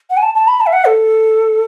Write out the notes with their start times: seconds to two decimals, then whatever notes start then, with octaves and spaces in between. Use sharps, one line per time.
0.10 F#5
0.17 G#5
0.22 A5
0.35 A5
0.48 B5
0.60 A5
0.66 E5
0.73 F#5
0.85 A4